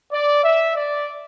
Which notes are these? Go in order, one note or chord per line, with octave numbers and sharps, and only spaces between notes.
D5
E5
D5